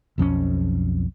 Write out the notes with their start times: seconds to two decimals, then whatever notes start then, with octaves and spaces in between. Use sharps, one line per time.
0.18 B1 F2 G3 C#4